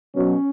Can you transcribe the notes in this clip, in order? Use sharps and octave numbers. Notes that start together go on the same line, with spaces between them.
B2 F#3 C#4